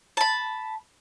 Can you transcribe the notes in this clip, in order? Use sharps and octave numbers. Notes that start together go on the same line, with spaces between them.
A5 B5